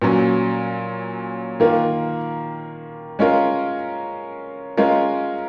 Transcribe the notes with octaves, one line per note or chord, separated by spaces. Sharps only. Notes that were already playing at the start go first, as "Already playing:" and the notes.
A#2 F#3 C#4
D#3 A#3 F4 A#4
G#3 C#4 F4 A#4
G#3 C#4 F4 A#4